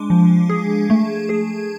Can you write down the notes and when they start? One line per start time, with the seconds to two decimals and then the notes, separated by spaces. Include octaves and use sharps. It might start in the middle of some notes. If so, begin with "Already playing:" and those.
Already playing: G#3 D4
0.10 F3
0.49 G#4
0.90 A3
1.29 G#4